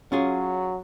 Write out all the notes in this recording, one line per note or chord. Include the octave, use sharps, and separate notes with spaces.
F#3 C#4 F4 G#4